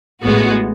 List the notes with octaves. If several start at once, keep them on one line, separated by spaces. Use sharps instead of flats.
A1 A2 G#3 B3 F#4